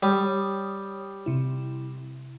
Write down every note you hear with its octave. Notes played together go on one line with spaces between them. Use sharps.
G3 C#5 D#6
C3 E4